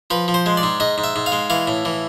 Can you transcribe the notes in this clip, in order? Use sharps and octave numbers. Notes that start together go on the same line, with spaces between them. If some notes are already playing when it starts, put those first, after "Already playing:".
F3 B4
F3
C5
G#3
D5
G#2
G#2 D#5
G#2
E5
G#2
F5
G#3
E3 F5
A2
E3